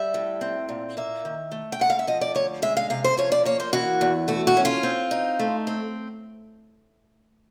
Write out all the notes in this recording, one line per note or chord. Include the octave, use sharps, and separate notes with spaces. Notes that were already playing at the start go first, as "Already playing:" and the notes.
Already playing: G3 E5
A2
C4
A#2
A#3 E5
D#3
A3
G5
G#2 F#5
F5
E5
F3 D#5
D5
D2 C#5
G#3 E5
F5
C3 F5
C5
F3 C#5
D5
A#3 C#5
C5
E3 F#4
E2
A3 F#4
F#4
C#4
F4
C4
D#4
A3
C4